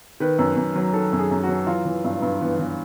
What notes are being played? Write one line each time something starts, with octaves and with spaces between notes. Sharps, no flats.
D#3 B4
F#2
F#2
F#3
D#3 A4
F#2
G#4
F#2
F#4
F#3
E3 F4
E3
G2
G2
E3 B3
E3